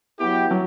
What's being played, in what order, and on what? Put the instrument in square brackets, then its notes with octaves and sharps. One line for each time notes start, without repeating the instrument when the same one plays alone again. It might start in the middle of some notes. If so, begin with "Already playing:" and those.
[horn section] F#3 B3 E4 G4
[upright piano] F#3